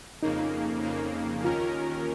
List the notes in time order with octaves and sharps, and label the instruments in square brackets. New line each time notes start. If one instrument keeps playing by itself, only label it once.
[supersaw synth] F2 C#3 A#3 [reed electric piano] D#4
[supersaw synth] F2 C#3 A#3
[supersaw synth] D#2 D#3 C#4 A#4 [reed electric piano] F4